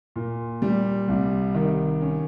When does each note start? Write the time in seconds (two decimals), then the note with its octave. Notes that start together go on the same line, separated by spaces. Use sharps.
0.16 A#2
0.62 G3
1.08 C2
1.55 D#3
2.01 C#4